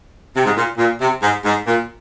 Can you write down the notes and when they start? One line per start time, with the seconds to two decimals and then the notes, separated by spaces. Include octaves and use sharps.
0.35 C3
0.45 G#2
0.56 A#2
0.78 A#2
1.00 C3
1.22 G#2
1.44 G#2
1.66 A#2